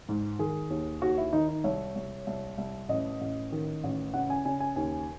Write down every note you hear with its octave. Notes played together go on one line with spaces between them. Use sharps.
G#2
D#3 G#4
D#2
D#2 F#4
E4
D#3 D#4
D#4
C2 C#5
C2
C2
C2
A1 D#5
A1
D#3
A1
C#3 F#5
G#5
C#3 G#5
G#5
D#2 G#5